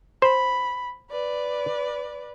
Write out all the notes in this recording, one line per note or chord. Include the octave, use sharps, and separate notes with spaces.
C5 B5
B4 D5